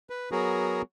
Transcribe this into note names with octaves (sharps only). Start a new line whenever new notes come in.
B4
F#3 B3 F#4 G#4 A#4